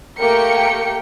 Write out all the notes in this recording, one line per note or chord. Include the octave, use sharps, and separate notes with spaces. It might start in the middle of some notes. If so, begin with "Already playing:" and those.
A3 A#3 G4 A#4 G5 C#7